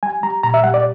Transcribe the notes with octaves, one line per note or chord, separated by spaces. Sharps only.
G3 G#5
G3 A#5
A#2 A#5
E5
G3 F#5
D5